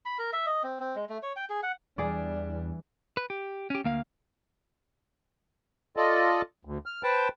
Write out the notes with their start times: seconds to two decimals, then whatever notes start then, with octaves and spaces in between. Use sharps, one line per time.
0.06 B5
0.19 A#4
0.33 E5
0.46 D#5
0.63 C4
0.80 C4
0.96 G#3
1.10 A3
1.23 C#5
1.36 G5
1.50 G#4
1.63 F#5
1.98 E2 E3 G3 D4 G#4 D5
3.17 B4
3.30 G4
3.70 C#4 G4
3.84 D2 A#3 F5
5.97 F4 A4 D5 D#5
6.65 D2
6.86 F6
7.03 B4 C5 G5 A5